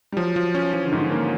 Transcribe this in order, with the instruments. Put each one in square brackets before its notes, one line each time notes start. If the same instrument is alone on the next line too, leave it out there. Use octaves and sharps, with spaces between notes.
[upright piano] G3
[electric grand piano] F3 [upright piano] F#3
[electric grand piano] F3
C#4
[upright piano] E3 [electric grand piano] F3
[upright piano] D3
[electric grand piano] G#2 [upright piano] D#3
[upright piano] E3 [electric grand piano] A#3